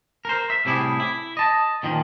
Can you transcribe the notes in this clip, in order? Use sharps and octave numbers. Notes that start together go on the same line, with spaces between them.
A#4 C5
E5
A2 C3 G3 E4 G#4
E4
D#5 A5
A#2 D#3 F3